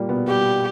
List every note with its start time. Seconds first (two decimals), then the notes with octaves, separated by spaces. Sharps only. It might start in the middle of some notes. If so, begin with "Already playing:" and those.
Already playing: A#2 G3 A#3
0.09 B2 B3
0.28 G3 G4